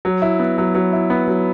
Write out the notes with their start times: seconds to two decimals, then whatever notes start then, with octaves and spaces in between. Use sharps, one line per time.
0.05 F#3
0.22 E4
0.39 B3
0.58 F#3
0.75 F#3
0.93 E4
1.10 B3
1.28 F#3